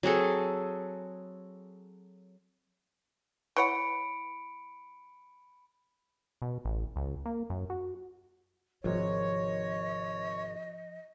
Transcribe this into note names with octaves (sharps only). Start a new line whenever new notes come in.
F#3 C4 G#4 A4
E3 C#5 F#5 B5 C#7 D7
B2
A1
C#2
A#3
F#2
F#4
G#1 C3 F3 F4 C#5 D#5